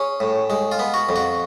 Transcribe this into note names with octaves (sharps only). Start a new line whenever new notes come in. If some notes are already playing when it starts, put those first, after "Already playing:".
Already playing: C#4 G#4
A2
G#3
F4
B3
F#4
F2
F#4